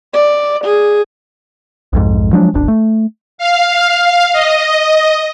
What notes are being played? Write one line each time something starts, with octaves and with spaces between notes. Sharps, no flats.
D5
G#4
B1 F2 G#2
F3 F#3 G#3 D4
D#1 G#1 D4
A3
F5
D#5